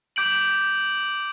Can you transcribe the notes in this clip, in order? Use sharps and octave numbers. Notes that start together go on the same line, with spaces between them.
D6 G6 D7 F#7